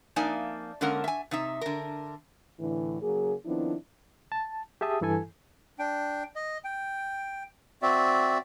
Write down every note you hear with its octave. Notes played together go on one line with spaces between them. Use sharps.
F2 A#3 D#4 D5 E5 G#5
D3 G#3 A#3 C#4 A#4 F#5
E5 G#5
C3 D#4 E5
D3 A#4
A2 D3 E3
C#3 F#3 A#3 G#4
D#3 F3 B3 C4 D4 E4
A5
G4 G#4 E5 A5 D#6
G2 E3 E4 A4 G#5
D4 G5
D#5
G5
C4 F#4 D5 E5